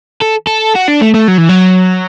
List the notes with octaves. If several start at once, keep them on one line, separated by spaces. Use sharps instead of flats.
A4
A4
F#4
D4
A3
A3
F#3
E3
F#3